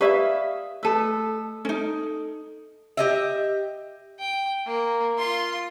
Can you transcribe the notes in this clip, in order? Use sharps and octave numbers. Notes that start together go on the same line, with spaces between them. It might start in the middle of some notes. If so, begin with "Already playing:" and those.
G4 B4 D5 E5 F5 D#6
A3 A4 B4 E6
C#4 D#4 A4
G4 D#5 E5
G5
A#3
F4 C6